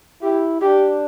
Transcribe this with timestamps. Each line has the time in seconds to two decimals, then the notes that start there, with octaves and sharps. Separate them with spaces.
0.22 E4 G4
0.62 D4 G4